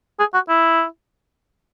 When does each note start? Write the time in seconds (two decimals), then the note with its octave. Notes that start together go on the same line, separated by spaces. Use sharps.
0.20 G#4
0.34 F#4
0.49 E4